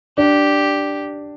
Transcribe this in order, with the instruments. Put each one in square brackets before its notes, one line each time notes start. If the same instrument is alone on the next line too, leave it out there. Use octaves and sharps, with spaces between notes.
[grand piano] D4 [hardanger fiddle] G4